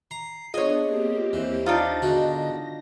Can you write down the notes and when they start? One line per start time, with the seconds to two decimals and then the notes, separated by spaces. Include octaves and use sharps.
0.11 A#5 C7
0.54 B3 D4 F4 G#4 C#5 D#5 G#5
0.84 A#3 C4 G4
1.33 D#2 E3 C5
1.66 D4 D#4 F4 A#6
2.02 G#2 B2 D3 F#4